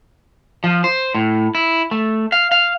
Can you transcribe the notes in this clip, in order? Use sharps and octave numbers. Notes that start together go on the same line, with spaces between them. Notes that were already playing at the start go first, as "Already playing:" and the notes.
F3
C5
A2
E4
A3
F5
F5